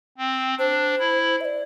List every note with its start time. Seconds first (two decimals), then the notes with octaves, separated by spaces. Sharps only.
0.18 C4
0.58 D4 C5
0.99 E4
1.41 E5
1.45 D5